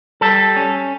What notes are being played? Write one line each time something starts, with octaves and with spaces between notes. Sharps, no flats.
G3 A4
C#4